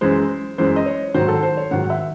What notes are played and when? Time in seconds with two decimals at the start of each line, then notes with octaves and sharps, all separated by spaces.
0.01 F#2 E3 G#3 C5
0.58 F#2 E3 G#3 C5
0.76 D#5
0.86 C#5
1.14 G#2 D#3 F#3 C5
1.28 A4
1.43 C5
1.57 C#5
1.71 G#2 D#3 F#3 F#5
1.84 F#5
1.90 E5